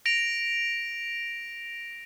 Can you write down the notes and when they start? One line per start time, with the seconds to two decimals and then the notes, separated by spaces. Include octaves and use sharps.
0.06 A#6 D7 F7